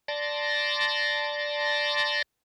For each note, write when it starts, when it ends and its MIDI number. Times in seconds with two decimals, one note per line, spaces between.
0.08 2.22 74
0.08 2.22 81
0.08 2.22 84
0.08 2.22 94